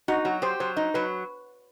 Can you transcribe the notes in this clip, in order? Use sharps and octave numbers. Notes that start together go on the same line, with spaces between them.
D#4 F#4
F#3 F#4
G4 C5
F#3 C5
D#4
F#3 B4